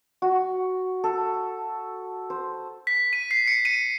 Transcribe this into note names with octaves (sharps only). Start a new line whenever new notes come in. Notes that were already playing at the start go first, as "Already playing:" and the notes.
F#4
A4
C5
B6
D#7
C7
C#7
D#7